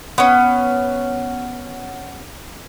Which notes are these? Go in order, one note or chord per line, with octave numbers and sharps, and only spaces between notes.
B3 C#4